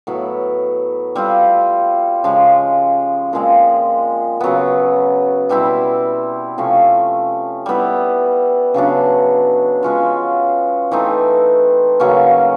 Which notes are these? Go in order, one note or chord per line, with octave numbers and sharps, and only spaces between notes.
A2 F#3 B3 E4
G3 C4 F4
C#3 F3 G#3
A#2 F3 G#3 C4
C#3 F#3 B3
B2 G3 C4 E4
C3 F3 A3 C#4
G3 B3 E4
C#3 F#3 B3 D4
F3 G#3 C#4 F4
E3 A3 C4 D#4
C#3 F#3 A#3 C#4